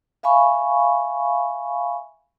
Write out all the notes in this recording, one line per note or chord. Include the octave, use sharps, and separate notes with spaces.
E5 F5 G#5 B5 C#6